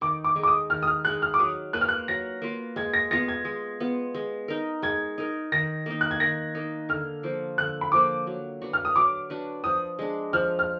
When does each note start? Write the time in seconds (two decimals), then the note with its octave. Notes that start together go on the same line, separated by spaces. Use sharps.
0.01 D#3 D6
0.24 D6
0.36 G#3 D#4 G#4
0.43 D6
0.48 D#6
0.70 D#3 F6
0.83 D#6
0.87 F6
1.04 G#3 D#4 G#4 F#6
1.22 F6
1.34 D6
1.39 F#3 D#6
1.73 A#3 F4 B4 F#6
1.81 F6
1.89 F#6
2.08 F#3 A#6
2.42 A#3 F4 B4
2.76 G#3 G#6
2.94 A#6
3.11 B3 F4 A#6
3.28 G#6
3.45 G#3
3.80 B3 F4
4.14 G#3
4.48 D#4 A#4
4.82 G#3 G#6
5.18 D#4 A#4
5.52 D#3 A#6
5.86 A#3 D#4
6.01 F#6
6.11 G#6
6.20 D#3 A#6
6.55 A#3 D#4
6.89 D3 F6
7.23 F3 A#3
7.58 D3 F#6
7.81 B5
7.92 F3 A#3 D6
8.27 F#3
8.62 D4 F#4 B4
8.73 F6
8.85 D#6
8.96 F#3 D6
9.30 D4 F#4 B4
9.64 F3 D#6
9.99 G#3 D4
10.33 F3 F6
10.59 F6